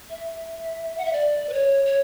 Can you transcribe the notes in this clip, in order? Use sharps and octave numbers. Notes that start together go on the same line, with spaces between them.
E5
F#5
E5
D5
B4
C#5
C#5